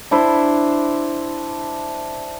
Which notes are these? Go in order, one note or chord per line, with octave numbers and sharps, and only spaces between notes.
D4 E4 C5